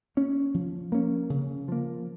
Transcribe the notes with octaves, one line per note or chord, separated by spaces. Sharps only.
A#3 C#4
F3
A#3 C#4
C#3
F3 A#3